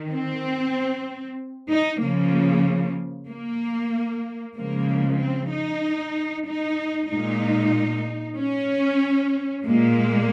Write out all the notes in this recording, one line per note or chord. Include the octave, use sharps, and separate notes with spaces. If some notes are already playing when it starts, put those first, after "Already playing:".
Already playing: D#3
C4
D#4
C#3 F3 A#3
A#3
C#3 F3 G#3 A#3
C4
D#4
D#4
A#2 G#3 D#4
C#4
A#2 G#3 A#3